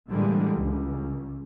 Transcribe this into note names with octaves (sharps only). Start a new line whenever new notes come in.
A2 D3 E3 G3 G#3 A#3
C#2